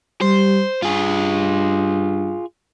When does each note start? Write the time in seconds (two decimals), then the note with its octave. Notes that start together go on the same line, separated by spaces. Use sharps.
0.22 G3 C5
0.82 G2 F4 G#4